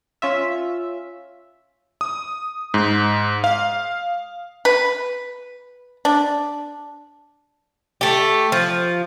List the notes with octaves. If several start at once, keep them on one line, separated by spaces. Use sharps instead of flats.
C#4 F4 E5
D#6
G#2
F5
B4
D4
A3 G4
F3